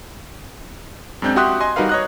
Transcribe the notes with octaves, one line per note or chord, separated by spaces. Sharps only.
F#2 G#3 C4 D4 G6
F#4 G4 E5 C6 D#6 F#6
D#5 G#5 C6
G3 D#4 F#4 A#4 B4 F5
C#5 D#5 F#6